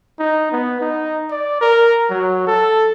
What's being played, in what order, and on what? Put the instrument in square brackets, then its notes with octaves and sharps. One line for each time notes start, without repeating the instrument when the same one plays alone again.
[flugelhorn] D#4
B3
D#4
D5
A#4
F#3
A4